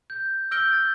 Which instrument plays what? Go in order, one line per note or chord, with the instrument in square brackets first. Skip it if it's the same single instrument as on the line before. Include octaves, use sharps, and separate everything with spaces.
[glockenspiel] G6
E6 F6 G6 A#6 D7 G7
A6